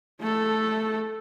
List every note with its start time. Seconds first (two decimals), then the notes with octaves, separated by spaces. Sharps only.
0.20 A3 A4